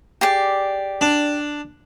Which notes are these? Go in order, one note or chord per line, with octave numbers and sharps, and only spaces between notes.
G4 G#4 D5
D4